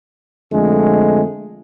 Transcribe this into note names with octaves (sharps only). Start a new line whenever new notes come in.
F2 D3 G#3 A3